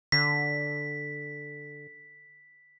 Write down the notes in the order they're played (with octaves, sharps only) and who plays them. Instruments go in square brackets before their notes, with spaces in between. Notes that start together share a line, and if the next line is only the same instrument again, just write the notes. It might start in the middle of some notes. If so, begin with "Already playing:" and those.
[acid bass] D3 [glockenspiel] B6